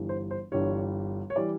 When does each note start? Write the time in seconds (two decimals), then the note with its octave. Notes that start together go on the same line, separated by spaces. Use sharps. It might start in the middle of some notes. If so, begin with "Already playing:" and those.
Already playing: G1 G2 E3 G3
0.09 C5
0.31 C5
0.52 G1 G2 E3 G3 C#5
1.30 C#5
1.36 E3 G3 D5